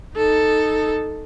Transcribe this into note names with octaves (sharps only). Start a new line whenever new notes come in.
D#4 A4